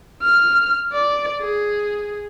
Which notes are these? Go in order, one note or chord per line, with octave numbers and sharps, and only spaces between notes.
F6
D5
G#4